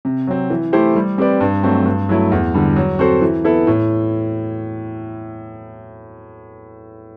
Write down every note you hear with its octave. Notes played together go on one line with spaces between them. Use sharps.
C3
F#3 C4
E3
A3 E4 G4 C5
G3
C4 G4 B4 D5
G2
F#3 A3 C4 F#4
G2
F#3 A3 E4
E2
D3 G3
F#3
C4 F#4 A4 C5
E3
B3 E4 A4
A2